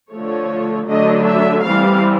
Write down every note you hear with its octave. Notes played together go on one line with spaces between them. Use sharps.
D3 F3 A3 C#5
D3 F#3 A3 D4 D#5
E5
E3 G3 C4 F5